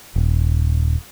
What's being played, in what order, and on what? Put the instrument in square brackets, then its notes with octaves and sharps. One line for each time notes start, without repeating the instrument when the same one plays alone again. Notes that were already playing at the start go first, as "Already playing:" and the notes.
[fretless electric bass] D#1